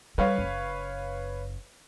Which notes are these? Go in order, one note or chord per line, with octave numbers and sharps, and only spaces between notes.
G3 B4 C#5 F5
F#1 C#4